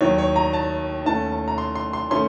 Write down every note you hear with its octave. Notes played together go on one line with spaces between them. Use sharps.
D#2 D#3 F#3 C#5
C#5
A#5
A5
D#2 D#3 A3 C#4 A5
A5
A#5
C6
C6
C6
D#3 A3 C#4 C6